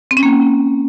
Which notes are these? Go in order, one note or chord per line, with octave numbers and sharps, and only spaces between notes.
C4
C#4
A#3